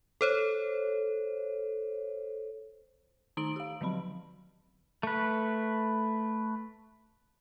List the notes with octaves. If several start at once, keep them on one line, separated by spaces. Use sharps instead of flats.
A4 C5 C#5
D#3 D#4 A#5 D#6 D7 F#7
G4 F5
D3 F3 F#3 C4 B5
A3 B4